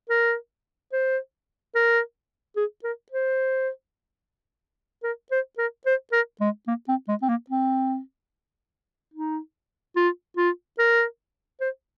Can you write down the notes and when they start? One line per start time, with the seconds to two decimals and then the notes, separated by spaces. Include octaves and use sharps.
0.10 A#4
0.93 C5
1.75 A#4
2.56 G#4
2.84 A#4
3.12 C5
5.03 A#4
5.31 C5
5.58 A#4
5.86 C5
6.12 A#4
6.41 G#3
6.68 A#3
6.88 C4
7.08 G#3
7.22 C4
7.29 A#3
7.50 C4
9.14 D#4
9.96 F4
10.37 F4
10.79 A#4
11.61 C5